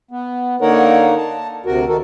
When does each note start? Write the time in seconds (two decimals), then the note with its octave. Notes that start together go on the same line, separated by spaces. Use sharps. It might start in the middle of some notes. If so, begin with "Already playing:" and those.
0.11 B3
0.61 D3 A#3 D#4 A#4 C#5 F#5
1.17 A5
1.66 D2 C3 F#4 A#4
1.88 D#3 F#4 A4 A#4